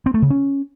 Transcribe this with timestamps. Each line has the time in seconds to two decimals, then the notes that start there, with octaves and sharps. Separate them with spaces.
0.06 C4
0.14 A3
0.22 C#3
0.30 C#4